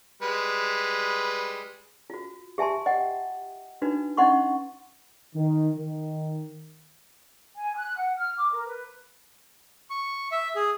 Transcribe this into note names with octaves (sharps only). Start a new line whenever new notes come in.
G3 G#3 B4
F4 F#4
G4 E5 G#5 A5 C6
D#5 F#5 G5
D4 D#4 F#4 B4
C#4 D#4 D#5 F#5 C6 C#6
D#3
D#3
G#5
F#6
F#5
F6
D6
A#4
B4
C#6
E5
G#4